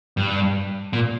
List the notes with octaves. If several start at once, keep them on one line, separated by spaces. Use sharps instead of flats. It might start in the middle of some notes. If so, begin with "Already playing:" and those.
G2
A#2